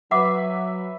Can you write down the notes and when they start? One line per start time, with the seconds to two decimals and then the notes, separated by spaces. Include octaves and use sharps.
0.11 F#3 B4 E5 F#5 D6